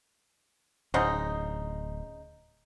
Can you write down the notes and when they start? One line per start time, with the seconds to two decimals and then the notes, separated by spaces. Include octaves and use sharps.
0.94 D1 C#3 D#4 C5 D#5 F#5